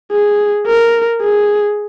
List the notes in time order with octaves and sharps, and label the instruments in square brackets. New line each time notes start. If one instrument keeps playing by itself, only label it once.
[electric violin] G#4
A#4
G#4